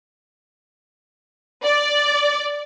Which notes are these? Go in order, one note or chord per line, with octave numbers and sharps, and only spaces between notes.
D5